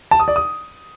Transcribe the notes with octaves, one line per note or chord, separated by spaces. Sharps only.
A5
D#6
D5
D#6